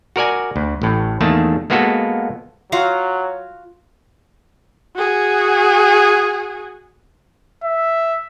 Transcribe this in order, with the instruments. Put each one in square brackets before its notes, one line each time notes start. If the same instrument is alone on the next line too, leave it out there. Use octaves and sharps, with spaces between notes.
[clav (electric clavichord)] F#4 A#4 D5 G#5
D2
A1 A2
E2 D#3 A3 A#3 A5
G#3 A#3 B3 F4 F#4 A4
[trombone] F#3 [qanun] F4 F#4 F5
[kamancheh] F#4 G#4
[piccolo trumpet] E5